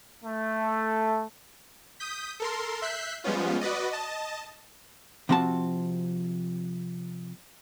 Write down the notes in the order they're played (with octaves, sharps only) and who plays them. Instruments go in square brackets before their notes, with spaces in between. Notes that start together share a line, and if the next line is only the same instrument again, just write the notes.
[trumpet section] A3
[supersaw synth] D#6 G6 B6
A4 A#4 C6
E5 F#6 G6 B6 C7
F3 G3 G#3 B3 C#4 F4
F#4 B4 D5 D#5
D#5 A5
[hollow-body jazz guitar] C3 F3 C4 F#4 A5